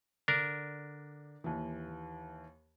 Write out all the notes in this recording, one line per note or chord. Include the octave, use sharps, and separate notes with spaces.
D3 D4 A#4
D#2 E3